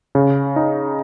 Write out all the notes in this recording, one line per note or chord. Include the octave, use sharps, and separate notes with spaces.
C#3
D#4